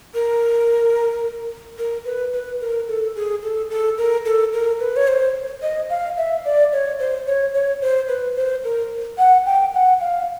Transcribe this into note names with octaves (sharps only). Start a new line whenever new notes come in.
A#4
A#4
B4
B4
A#4
A4
G#4
A4
A4
A#4
A4
A#4
B4
C#5
C5
D#5
F5
E5
D5
C#5
C5
C#5
C#5
C5
B4
C5
A#4
F#5
G5
F#5
F5